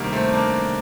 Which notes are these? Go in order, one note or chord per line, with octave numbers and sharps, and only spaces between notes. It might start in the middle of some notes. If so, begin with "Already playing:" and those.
Already playing: D2 C3 D#3 G3 A#3
A3 C4
A#3 D4